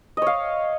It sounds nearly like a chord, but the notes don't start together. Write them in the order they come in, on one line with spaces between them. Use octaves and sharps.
D#5 C#5 F5